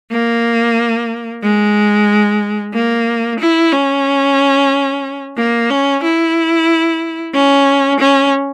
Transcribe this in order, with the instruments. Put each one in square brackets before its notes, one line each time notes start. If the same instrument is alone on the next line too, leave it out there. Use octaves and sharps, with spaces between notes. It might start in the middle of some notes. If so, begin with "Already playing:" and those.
[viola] A#3
G#3
A#3
E4
C#4
A#3
C#4
E4
C#4
C#4